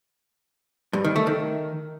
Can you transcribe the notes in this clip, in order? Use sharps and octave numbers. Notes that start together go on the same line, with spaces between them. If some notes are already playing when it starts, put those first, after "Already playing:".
G2
D#3
A3
D#3